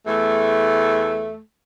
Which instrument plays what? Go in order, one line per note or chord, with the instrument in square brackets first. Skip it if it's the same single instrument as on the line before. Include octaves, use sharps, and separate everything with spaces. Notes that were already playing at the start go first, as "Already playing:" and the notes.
[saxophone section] E2 A3